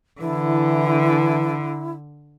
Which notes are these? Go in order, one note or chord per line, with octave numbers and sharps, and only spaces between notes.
D3 E3 E4